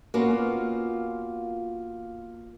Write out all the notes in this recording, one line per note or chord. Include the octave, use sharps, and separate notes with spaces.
A#3 B3 C#4 F4 F#4